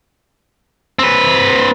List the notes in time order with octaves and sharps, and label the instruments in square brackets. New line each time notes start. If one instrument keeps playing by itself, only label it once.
[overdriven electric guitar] C4 B4